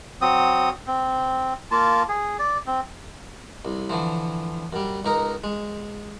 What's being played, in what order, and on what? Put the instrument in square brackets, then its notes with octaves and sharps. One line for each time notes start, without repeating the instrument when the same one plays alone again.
[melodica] F#3 C4 D#6
C4
A#3 F4 A5
G#4
D5
C4
[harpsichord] C2
D3 E3 F3
F#2 G3
C#2 D#4 A#4
G#3